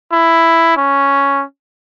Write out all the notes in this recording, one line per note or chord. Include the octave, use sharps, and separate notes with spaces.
E4
C#4